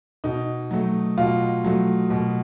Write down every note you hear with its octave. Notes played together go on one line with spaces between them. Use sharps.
B2 D#4
F#3 A3
B2 F4
F#3 A3
B2